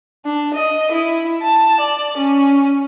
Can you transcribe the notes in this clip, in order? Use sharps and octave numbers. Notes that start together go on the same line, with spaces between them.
D4
D#5
E4
A5
D5
C#4